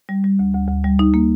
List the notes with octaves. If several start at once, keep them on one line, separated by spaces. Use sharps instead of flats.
G3
G3
D2
D2
D2
G3
D#4
A#3